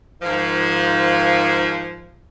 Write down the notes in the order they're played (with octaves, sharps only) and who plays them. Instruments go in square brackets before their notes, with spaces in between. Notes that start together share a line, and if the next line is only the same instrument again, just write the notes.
[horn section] G#2 D#3 F3